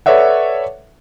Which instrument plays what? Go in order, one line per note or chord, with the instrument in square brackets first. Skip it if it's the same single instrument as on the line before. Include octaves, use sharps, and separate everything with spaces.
[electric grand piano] A4 B4 C#5 D5 E5 F#5